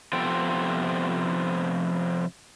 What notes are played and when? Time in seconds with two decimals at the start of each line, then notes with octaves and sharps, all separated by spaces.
0.13 C3 F3 B3 F4 A4 G5